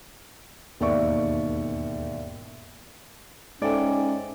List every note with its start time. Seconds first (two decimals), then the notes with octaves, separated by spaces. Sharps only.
0.80 E1 D#2 G#2 D5 E5 C#6
3.62 G#2 C#4 A4 D5 E5 G5 G#5